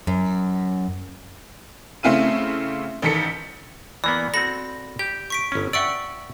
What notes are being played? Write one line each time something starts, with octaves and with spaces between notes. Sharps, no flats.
F#2
C#3 A3 C4 E4 F5 D#7
A1 D#3 A4 B6 C#7
E3 A#3 B3 D5
C4 F#4 A4 B5 A#6
G4 G6
C#6 B6 D7
G1 C#4
D5 E5 F#5 G5 C#6 E6